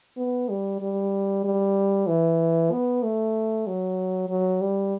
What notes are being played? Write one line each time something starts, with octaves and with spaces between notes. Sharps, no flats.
B3
G3
G3
G3
E3
B3
A3
F#3
F#3
G3